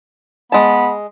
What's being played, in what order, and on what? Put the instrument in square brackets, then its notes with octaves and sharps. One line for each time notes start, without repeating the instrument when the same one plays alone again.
[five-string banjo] G#3 A5 [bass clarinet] B3